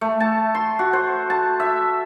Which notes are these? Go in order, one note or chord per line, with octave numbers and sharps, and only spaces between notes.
A3
A5
C6
F#4
C5
A5
E5